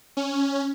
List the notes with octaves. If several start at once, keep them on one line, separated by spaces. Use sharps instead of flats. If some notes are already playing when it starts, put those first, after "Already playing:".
C#4